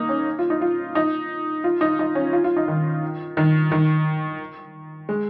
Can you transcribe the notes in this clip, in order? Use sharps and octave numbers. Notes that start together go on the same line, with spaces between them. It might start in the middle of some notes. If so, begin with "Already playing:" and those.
Already playing: A#3 D#4
C#4
F4
D#4
F4
D#4
F4
D#4
D#4
C#4
F4
F4
D#4
D#3
D#3
D#3
G#3